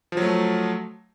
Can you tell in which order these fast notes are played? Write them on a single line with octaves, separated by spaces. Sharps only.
F3 F#3 A3